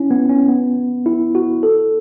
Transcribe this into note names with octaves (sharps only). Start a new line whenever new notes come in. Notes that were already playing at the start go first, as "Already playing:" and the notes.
Already playing: C#4 E4
B3
C#4
B3
E4
F#4
A4